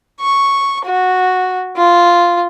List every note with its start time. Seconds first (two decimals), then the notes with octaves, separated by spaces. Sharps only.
0.20 C#6
0.84 F#4
1.76 F4